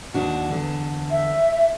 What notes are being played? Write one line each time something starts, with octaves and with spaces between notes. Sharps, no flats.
D#2 D4 F#4
E2 D3
E5